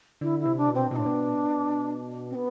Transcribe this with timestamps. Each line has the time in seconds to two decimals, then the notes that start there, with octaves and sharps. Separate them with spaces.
0.21 D3 E4
0.39 E4
0.46 C3
0.57 D4
0.68 B2
0.74 C4
0.91 B2 E4
0.95 A2 D4
1.06 B2
2.30 C4
2.34 B3